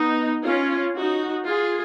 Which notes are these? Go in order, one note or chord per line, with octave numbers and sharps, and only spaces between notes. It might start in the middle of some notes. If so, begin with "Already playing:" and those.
Already playing: B3 D#4
C#4 F4
D#4 F#4
F4 G#4